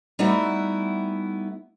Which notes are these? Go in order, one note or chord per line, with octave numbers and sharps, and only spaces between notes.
G3 A3 B3 D#4 E4 F#4